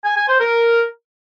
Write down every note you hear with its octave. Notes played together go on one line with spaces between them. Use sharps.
G#5
G#5
C5
A#4